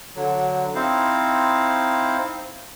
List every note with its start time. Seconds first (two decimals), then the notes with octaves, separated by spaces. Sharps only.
0.16 D3 F#3
0.75 C4 D#4 E4 C5 F5